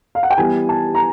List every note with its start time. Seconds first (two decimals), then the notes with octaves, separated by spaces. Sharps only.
0.15 F5
0.23 F#5
0.31 G5
0.38 E3 G3 B3 G#5
0.69 A5
0.95 A#5